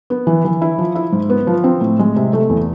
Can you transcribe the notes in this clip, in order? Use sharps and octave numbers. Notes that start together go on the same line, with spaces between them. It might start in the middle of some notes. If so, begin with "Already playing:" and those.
B3
E3
E3
E4
F3
E4
G#2
B3
F3
C4
A2
G#3
C3
A3
E2